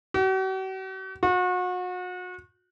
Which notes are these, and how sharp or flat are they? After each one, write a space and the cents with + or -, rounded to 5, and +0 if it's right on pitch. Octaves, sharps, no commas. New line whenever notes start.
F#4 +45
F#4 -35